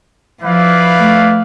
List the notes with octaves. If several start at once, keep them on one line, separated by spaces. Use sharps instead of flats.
F3 E4 B4 D5 F5
A3